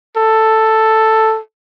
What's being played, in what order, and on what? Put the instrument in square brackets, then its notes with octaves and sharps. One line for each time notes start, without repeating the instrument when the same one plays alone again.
[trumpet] A4